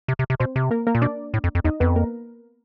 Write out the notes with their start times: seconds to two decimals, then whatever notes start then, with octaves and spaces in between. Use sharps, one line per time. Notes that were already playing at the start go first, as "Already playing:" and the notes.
0.08 C3
0.19 C3
0.30 C3
0.40 B2 C4 C5
0.56 C3
0.71 A#3 A#4
0.87 A#3 A#4
0.95 A#2
1.02 B2 D4 D5
1.34 A2
1.44 F2
1.55 F2
1.64 E2 D#4 D#5
1.80 F2 B3 B4
1.96 A#3 A#4